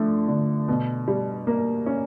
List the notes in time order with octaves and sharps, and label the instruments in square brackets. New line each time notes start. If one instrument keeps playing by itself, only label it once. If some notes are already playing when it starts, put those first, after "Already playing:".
Already playing: [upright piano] D3 F3 A3
D3
B2
G3
A#3
C#4